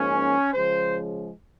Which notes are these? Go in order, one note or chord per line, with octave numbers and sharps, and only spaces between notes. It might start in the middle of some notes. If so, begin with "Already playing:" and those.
Already playing: G#2 F3 A#3 C#4
C#3 F3 G#3 C5